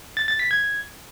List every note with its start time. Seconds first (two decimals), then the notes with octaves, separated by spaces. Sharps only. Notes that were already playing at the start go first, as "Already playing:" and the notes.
0.17 A6
0.28 A6
0.39 B6
0.51 G#6